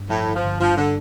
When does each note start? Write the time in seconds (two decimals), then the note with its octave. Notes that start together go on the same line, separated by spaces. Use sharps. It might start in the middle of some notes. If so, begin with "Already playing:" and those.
Already playing: G2
0.09 A2 F3
0.27 G1
0.35 F3
0.44 G1
0.60 G2 F3
0.77 D3 D4